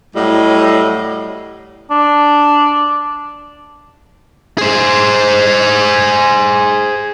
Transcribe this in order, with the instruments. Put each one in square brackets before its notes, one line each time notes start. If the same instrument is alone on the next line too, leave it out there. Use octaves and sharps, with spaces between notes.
[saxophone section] A2 F#3 G3 D#5
[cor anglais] D4
[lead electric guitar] G#4 C5